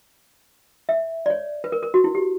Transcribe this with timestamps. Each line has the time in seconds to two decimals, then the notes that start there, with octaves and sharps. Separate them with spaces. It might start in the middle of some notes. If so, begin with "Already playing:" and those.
0.89 E5
1.26 D5
1.30 C#5
1.64 B4
1.72 A#4
1.83 A#4
1.94 F#4
2.04 E4
2.15 G4